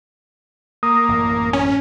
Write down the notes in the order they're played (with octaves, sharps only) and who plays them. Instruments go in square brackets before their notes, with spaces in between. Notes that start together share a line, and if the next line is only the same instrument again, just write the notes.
[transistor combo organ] A#3 [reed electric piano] D#6
[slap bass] A1 F#2 A2
[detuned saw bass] C#4